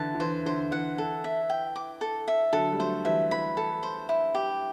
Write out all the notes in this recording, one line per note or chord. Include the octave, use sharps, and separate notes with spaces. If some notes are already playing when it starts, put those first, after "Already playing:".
Already playing: D3 E3 A5
D3
E3 C5
D3 C5
E3 F#5
A4
E5
G5
D6
A4
E5
D3 F#3 A4
G3
F#3 A3 C5
E3 G3 E5
E3 B5
A4
C5
E4
G4